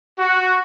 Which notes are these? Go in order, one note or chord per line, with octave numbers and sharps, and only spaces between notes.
F#4